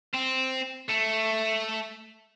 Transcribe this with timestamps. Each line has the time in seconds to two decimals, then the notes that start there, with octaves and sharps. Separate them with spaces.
0.14 C4
0.89 A3